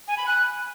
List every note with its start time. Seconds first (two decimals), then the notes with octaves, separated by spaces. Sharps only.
0.08 G#5
0.17 B5
0.26 F#6